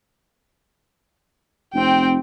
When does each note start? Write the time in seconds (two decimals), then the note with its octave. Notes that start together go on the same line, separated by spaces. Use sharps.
1.74 F1 C4 G5